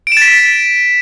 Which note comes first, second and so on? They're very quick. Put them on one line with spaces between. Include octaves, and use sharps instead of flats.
D7 E7 A6 B6